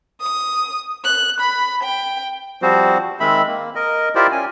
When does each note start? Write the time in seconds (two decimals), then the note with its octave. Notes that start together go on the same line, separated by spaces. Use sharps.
0.21 D#6
1.05 F#6
1.40 B5
1.83 G5
2.62 F3 G3 C4 F#4 C5
3.20 D#3 G#3 C4 E5 B5
3.47 A#3
3.75 A#4 D#5
4.15 E4 F4 G4 A#4 C5 D5
4.32 C#4 G#5